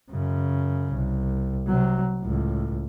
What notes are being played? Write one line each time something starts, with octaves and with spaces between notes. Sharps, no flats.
F#2 C#3
C2
C3 F#3
C#2 A2